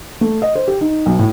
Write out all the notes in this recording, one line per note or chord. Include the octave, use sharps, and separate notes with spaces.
A3
D#5
C5
G4
D#4
B1
A2